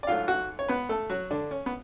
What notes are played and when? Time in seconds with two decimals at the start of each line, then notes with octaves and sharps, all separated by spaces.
0.03 D5
0.07 G#2 F#3 A3 F4 F5
0.28 F#4 F#5
0.59 C#5
0.68 B3 B4
0.89 A3 A4
1.10 F#3 F#4
1.31 D3 D4
1.51 C#4
1.66 B3